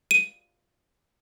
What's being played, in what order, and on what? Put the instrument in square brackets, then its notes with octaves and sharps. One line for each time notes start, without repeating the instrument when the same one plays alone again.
[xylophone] D#7